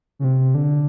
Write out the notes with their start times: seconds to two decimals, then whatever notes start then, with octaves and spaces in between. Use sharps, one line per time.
0.19 C#3
0.24 C3
0.55 D3